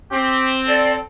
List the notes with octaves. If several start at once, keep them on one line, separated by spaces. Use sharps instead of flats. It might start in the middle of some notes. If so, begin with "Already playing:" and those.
C4 G4
A4 D5